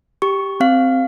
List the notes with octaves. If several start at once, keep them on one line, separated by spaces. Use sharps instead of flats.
G4 C#6
C4 F5